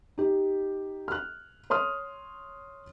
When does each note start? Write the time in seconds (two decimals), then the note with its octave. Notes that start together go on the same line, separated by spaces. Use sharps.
0.18 D#4 G4
1.08 F6 F#6
1.70 C#5 C6 D#6 F6